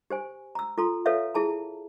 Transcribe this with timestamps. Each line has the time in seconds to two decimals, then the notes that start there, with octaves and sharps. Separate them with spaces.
0.10 G4 C5 G#5
0.55 A#5 E6
0.78 F4 A4 A#5 C6
1.06 A4 B4 C#5 E5 F5
1.35 E4 G#4 A5 A#5